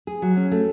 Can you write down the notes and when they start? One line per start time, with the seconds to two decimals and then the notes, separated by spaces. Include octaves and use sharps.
0.07 G#4
0.22 F#3
0.37 C#4
0.52 A3